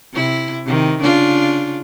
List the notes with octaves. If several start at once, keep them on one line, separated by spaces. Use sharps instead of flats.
C3 E4
C3 D#3
C#3 D4 F4